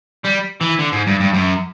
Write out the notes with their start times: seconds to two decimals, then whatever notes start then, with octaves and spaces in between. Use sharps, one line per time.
0.24 G3
0.61 E3
0.79 D3
0.93 G#2
1.07 G2
1.20 G2
1.34 F#2